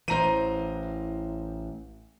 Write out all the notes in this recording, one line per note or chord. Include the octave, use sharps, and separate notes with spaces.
A1 E3 C5 A#5 D#7